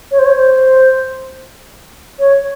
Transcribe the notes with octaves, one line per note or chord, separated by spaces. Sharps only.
C#5
C5
C#5
C5
C#5